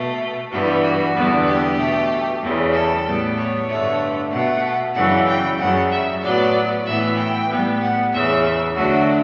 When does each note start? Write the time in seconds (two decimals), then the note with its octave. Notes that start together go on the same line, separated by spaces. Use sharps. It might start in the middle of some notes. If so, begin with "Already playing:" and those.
Already playing: B2 A3
0.51 G2 E3 G3 B3
0.82 F#4
1.14 E2 D3 G3 B3
1.46 G4
1.77 B2 A3
2.41 E2 C#3 G3
2.73 A4
3.05 A2 G3 B3
3.36 C#5
3.69 G2 D3 A3
4.31 B2 A3 F#5
4.95 F#2 C#3 E3 G3 F#5
5.27 G5
5.58 F#2 C#3 G3 F#5
5.90 E5
6.22 A2 F#3 B3 D5
6.85 A2 E3 B3 E5
7.17 G5
7.48 A2 G3 B3
7.80 F#5
8.12 E2 C#3 E3 E5
8.75 D2 D3 F#3 A3 F#4